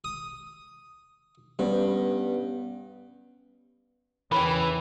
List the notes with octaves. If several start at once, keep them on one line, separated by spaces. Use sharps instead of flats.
D#6
G2 G3 B3 C#4
E2 C#3 E3 A#4 C#5 G5 B5